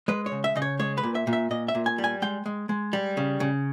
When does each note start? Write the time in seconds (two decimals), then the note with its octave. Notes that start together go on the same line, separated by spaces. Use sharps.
0.08 G#3 B4
0.26 C#5
0.32 C#3
0.44 E5
0.55 C#3 D#5
0.62 C#5
0.79 G#3 C#5
0.98 B4
1.03 A#2
1.15 E5
1.27 A#2
1.33 E5
1.51 A#2 D#5
1.68 E5
1.75 A#2
1.86 G#5
1.98 G3
2.04 G#5
2.22 G#3 G5
2.46 G#3
2.69 G#3
2.93 G3
3.17 C#3
3.40 C#3